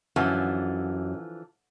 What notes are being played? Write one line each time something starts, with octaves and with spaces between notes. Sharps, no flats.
F#2 D3 E3 F3